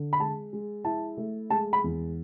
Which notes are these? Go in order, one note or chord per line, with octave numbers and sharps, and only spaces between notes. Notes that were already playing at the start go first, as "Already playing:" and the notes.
Already playing: D3
B5
G#3 A5
G#3
E4 A5
A3
G#3 A5
B5
E2